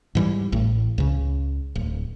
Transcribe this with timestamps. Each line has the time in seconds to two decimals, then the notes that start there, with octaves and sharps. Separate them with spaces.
0.15 G#2 E3 G3
0.52 A1 A2
0.98 C#2 C#3
1.75 D1